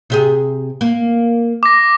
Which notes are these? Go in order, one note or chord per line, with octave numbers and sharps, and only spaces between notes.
C3 G4 G#4
A#3
D6 A#6